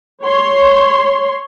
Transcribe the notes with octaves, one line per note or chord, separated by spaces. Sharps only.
C#5 C6